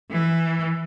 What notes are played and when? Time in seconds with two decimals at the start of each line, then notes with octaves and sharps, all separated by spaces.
0.11 E3